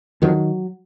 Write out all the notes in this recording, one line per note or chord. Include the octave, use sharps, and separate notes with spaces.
F2 D#3 F#3